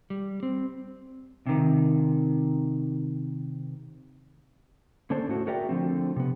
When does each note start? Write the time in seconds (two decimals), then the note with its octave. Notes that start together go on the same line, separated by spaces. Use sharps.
0.10 G3
0.43 C4
1.46 C3 D#3
5.10 D3 A#3 C#4 D4 A4 C5
5.28 A2 A3 F#4
5.47 F#4 G#4 A#4 D5 E5 G5
5.69 D3 F3 A3 C4
6.16 C3 B3